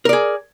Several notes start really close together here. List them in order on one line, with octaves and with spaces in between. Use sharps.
A#4 D5 G#4